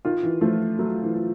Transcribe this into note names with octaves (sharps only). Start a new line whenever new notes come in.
D#3 F4
E3
F3 A3
F#3 A3
E3
F4